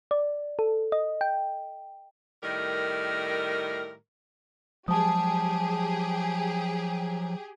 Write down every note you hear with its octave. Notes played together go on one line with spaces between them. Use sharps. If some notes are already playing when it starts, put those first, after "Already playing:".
D5
A4
D#5
G5
A2 D#3 G3 A#4
F3 F#3 G#3 G4 G#4 A5 D#6